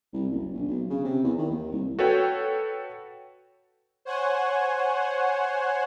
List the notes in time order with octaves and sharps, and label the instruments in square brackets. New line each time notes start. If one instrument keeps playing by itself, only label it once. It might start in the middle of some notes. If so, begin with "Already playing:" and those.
[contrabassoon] C2
F#1
A#1
B1
C#3
C3
E2
D#3
D#2
C2
[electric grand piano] F#4 A4 B4 C#5 G5
[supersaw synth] C5 C#5 F#5 G#5